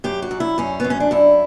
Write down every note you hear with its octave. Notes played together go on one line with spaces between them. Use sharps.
F#2 G4
F#4
F#2
E4
F#2 C#4
F#2 B3
C#4
D4
F#2 E4